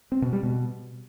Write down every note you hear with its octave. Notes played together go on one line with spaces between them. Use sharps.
C4
B2
G3
B2